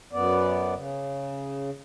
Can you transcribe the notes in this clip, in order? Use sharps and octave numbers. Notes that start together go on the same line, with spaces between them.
F#2 B3 D5
C#3